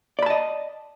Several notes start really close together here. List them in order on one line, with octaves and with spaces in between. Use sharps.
D5 B5 A5 D#5